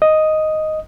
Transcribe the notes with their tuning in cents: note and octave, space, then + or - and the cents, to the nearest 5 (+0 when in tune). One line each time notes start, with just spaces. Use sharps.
D#5 +0 D#6 +0